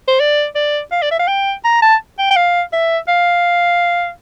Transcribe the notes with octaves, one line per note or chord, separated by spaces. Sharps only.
C5
D5
D5
F5
D5
E5
F5
G5
A#5
A5
G5
G5
F5
E5
F5